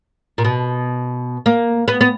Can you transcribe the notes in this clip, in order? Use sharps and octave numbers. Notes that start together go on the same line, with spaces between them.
A#2
B2
A#3
B3
B3